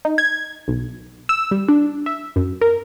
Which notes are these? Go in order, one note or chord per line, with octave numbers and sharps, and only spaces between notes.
D#4
G#6
B1
E6
G3
D4
E5
F#2
A#4